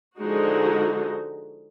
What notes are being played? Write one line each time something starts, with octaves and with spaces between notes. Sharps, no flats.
D3 F3 G#3 D#4 F#4